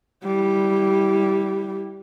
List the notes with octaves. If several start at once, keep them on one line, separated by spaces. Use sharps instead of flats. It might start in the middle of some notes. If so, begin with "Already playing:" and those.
G3 E4